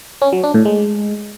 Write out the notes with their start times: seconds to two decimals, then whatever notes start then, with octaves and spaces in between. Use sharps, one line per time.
0.22 C#4
0.33 F#3
0.43 D4
0.54 A2
0.65 G#3